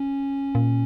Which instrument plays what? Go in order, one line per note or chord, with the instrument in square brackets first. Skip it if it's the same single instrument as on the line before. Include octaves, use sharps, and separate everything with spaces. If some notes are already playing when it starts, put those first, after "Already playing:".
Already playing: [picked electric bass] C#4
[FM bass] A#2